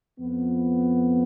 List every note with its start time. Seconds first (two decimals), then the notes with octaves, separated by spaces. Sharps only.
0.19 F2 F3 B3